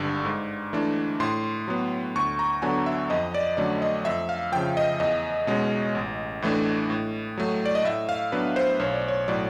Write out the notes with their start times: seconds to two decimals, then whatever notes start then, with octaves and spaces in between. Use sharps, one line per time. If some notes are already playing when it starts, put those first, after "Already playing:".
Already playing: G#1 G2 D3
0.25 G#2
0.73 E3 A3 D4
1.20 A2 C6
1.68 F#3 B3
2.16 D2 C#6
2.39 A#5
2.62 D3 F#3 B3 D4 G#5
2.86 E5
3.10 F2 D#5
3.34 D5
3.57 D3 F#3 A3 C#4 D5
3.82 D#5
4.05 F2 E5
4.29 F5
4.52 C#3 F3 G5
4.77 D#5
5.00 E2 D#5
5.47 B2 G#3 C#4
5.95 A1
6.42 A2 E3 A3 D4
6.90 A2
7.37 F#3 A3
7.66 D5
7.75 D#5
7.84 A2 E5
8.09 F5
8.32 F#3 B3 D4 B4
8.56 C5
8.80 B1 C#5
8.94 D5
9.08 C#5
9.28 A2 F#3 D5